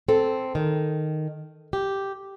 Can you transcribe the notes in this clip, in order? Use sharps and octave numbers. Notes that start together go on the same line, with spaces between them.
C4 A4
D#3
G4